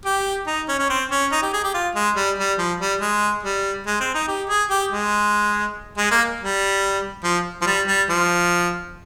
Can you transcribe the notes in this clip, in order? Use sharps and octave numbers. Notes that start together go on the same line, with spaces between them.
G4
D#4
C#4
C#4
C4
C#4
D#4
G4
G#4
G4
F4
G#3
G3
G3
F3
G3
G#3
G3
G#3
C4
D#4
G4
G#4
G4
G#3
G#3
A#3
G3
F3
F3
G3
G3
F3